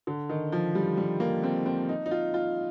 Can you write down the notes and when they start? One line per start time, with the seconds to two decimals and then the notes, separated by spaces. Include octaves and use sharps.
0.07 D3
0.29 D#3
0.52 F3
0.75 G3
0.97 G3
1.20 A#3
1.43 C4
1.66 C4
1.89 D#4
2.06 D#4
2.11 F4
2.34 F4